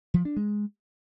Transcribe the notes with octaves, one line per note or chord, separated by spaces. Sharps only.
F3
D4
G#3